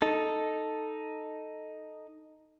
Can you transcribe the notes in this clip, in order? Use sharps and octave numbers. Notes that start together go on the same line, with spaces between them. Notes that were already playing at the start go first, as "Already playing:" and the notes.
D#4 A4